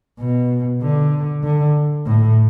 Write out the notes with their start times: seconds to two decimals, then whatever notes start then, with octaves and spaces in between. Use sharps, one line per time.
0.19 B2
0.81 D3
1.43 D3
2.06 A2